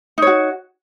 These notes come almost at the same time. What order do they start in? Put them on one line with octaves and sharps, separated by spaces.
D#4 C#5 F#4